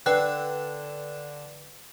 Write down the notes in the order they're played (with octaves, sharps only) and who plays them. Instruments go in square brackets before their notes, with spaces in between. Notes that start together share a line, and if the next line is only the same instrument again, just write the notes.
[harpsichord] D3 [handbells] B4 G5 F#6